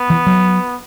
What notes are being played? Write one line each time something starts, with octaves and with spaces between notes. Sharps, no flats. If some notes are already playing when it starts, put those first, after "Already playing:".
Already playing: B3
E3
F#3